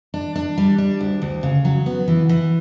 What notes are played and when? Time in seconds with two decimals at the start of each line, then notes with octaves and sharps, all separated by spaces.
0.14 D4
0.36 D4
0.58 G3
0.78 D4
1.00 D2
1.22 D2
1.43 C#3
1.65 F#3
1.86 B3
2.08 E3
2.29 E3